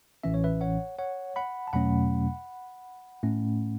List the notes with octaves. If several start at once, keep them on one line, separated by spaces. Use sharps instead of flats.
A1 A2 E3 C#4 E5
C#5
B4 E5
C#5 F#5
C#5 F#5
F#5 B5
A5
E2 B2 F#3 A3 C#4 F#5 B5
A2 A3 C#4